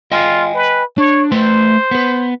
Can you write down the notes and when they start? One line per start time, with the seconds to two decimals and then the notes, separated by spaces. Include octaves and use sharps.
0.12 F4 D#5 G5 G#5
0.54 B4
0.98 D4 C#5
1.32 A3 B4 C5 C6
1.91 B3 B4